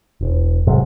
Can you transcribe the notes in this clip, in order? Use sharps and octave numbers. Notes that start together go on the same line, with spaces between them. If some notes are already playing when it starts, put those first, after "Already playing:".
E1
G#2 C3 F#3